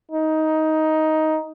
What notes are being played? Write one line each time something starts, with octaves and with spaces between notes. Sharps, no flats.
D#4